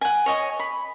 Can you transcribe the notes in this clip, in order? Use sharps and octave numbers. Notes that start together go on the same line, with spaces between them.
F#5 G#5
C#5 D#5 G#5
B5